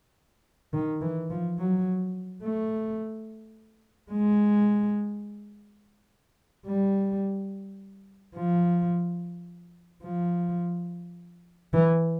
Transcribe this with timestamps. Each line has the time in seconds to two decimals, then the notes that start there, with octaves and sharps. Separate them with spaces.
0.73 D#3
1.01 E3
1.30 F3
1.59 F#3
2.43 A3
4.12 G#3
6.66 G3
8.36 F3
10.04 F3
11.74 E3